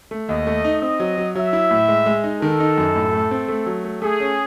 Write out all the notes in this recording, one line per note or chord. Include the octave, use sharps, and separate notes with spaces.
A3
D#2 D#5
A3
D#4
C4 D#5
F#3
F#3
F#3 E5
E4
A2
G#3
G#3
D#4
D#3 A4
D#4
F#2
A2
A3
C4
A3
F#3
A3
A3 G#4
C#4